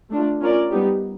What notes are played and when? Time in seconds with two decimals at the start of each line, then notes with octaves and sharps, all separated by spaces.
0.11 A3 D4 F4
0.41 C#4 F4 A#4 D5
0.70 G3 B3 D#4 G4